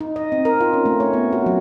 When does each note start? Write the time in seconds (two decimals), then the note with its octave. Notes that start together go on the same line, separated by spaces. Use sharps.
0.01 D#4
0.16 D#5
0.32 C4
0.45 A#4
0.60 F4
0.73 C#4
0.86 A3
1.00 C#5
1.13 B3
1.32 F#4
1.46 F#3